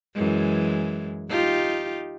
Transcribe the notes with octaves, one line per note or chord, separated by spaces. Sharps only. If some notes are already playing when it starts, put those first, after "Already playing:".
F#2 E3 G#3
D#4 F4 G4